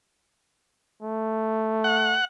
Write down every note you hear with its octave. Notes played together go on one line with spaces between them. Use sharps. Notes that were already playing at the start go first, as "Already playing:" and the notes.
A3
F#5